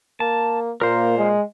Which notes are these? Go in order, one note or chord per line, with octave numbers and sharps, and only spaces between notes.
A#3 A5
A#2 A#3 A#4 C5
G#3